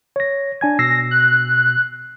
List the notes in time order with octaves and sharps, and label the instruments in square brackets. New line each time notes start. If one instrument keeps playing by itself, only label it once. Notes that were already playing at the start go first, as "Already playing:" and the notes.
[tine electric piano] C#5 A#6
D4 G#5 G#6
[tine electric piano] B2 E6 C7 [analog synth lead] A#6
[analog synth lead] F#6